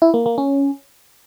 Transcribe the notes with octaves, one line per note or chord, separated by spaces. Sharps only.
E4
A#3
A#3
C#4